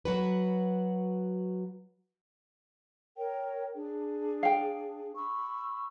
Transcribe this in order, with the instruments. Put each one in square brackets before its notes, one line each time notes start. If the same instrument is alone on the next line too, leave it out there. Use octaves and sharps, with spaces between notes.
[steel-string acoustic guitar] F#3 F#4 B4
[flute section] A#4 C#5 G5
D4 G#4
[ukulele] F5 G5
[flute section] B5 C#6 E6